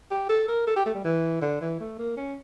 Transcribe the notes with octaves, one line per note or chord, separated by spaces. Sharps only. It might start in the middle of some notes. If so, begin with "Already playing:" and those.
G4
A4
A#4
A4
G4
A3
G3
E3
D3
E3
A3
A#3
C#4